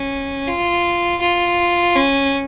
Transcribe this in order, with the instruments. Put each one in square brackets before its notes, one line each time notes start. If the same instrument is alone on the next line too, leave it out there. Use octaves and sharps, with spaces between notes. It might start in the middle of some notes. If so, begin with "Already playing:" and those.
Already playing: [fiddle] C#4
F4
F4
C#4